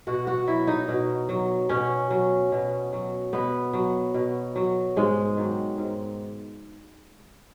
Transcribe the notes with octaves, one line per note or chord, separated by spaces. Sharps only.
B2 F#4
F#4
F#3 E4
D#4
B2
F#3
B2 C#4
F#3
B2
F#3
B2 B3
F#3
B2
F#3
G#2 G#3
D#3 F#3
G#2